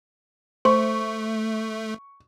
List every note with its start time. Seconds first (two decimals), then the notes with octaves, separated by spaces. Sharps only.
0.65 A3 C5 C#6